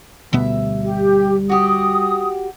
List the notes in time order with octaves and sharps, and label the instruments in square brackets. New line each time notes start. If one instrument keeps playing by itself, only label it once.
[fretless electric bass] D2 B2 B3 [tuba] G3 [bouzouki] E5
[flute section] G4
[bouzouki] F#4 G4 [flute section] D#6